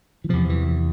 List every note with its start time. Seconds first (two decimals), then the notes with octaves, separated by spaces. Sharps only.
0.24 E3
0.29 E2 C3 F3
0.49 E3